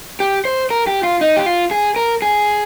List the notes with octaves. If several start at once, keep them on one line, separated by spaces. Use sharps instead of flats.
G4
C5
A#4
G4
F4
D#4
G4
F4
G#4
A#4
G#4